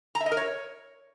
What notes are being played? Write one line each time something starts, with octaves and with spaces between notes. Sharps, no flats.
A#5
E5
D#5
A#4
C#5